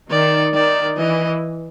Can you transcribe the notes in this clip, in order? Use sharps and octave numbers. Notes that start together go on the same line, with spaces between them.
D#3 D5
D#3 D5
E3 D#5